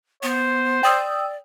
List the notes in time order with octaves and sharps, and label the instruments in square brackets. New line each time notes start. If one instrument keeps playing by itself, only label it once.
[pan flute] B3 [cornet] C5
[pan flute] D5 [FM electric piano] G5 D#6 E6